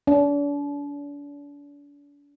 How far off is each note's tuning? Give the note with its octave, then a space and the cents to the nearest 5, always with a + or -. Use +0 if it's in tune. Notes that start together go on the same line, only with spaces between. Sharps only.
D4 -40